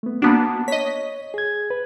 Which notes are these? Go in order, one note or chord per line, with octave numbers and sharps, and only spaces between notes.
A3 B3
A#3 B3 D4 F#4 A5
C#5 D#5 B6
G#4 G#6
B4